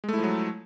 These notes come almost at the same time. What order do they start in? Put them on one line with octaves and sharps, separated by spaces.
G#3 A3 E4 F3 F#3